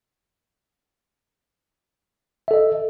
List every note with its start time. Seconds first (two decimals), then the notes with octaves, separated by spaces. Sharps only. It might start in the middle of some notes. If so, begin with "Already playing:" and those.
2.48 E5
2.51 A4
2.54 D#5